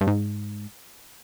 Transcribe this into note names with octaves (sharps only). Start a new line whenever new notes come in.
G2
G#2